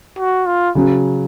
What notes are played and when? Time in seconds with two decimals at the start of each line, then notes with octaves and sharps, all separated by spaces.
0.19 F#4
0.46 F4
0.75 C#3 F#3